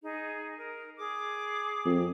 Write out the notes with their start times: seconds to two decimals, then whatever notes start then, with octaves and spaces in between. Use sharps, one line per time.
0.03 D#4 G#4
0.57 A#4
0.97 G#4 D6
1.85 F2